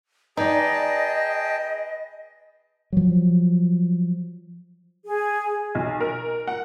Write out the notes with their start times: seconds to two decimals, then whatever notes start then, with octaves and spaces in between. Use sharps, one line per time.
0.37 D#4 G#4 B4 D5 D#5 G5 A5
2.93 F3 F#3
5.06 G#4
5.75 B1
6.00 A#4
6.47 F#5